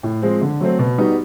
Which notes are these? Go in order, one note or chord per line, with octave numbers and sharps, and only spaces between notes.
A2
F3 G#3 C4
D3
F#3 A3 C4
B2
G3 B3 D#4 F#4